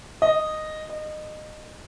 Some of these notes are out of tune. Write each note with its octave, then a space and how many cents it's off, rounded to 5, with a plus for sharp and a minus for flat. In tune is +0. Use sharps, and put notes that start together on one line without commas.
D#5 -5
D#5 -25